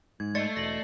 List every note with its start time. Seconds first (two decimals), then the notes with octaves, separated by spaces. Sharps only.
0.20 G#2 G#6
0.35 A3 D5 D#5 A6 C7 C#7
0.57 E1 A#6 F#7